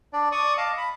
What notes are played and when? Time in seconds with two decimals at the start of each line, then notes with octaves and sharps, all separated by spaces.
0.13 D4 D5
0.32 D5 C#6 D#6
0.58 D#5 F5 A5 D6
0.77 B5